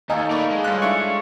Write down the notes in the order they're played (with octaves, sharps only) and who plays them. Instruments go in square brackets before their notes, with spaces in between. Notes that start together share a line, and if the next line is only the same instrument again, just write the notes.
[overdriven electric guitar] D#2 [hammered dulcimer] A3 A4 F5 [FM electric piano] D#4 [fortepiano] G#5
[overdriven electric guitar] A#4 B4 [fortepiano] D5 C#6
[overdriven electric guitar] G#3
[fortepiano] G2 F#6 [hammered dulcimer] F4 C#5
[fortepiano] D4 E4 [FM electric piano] C#6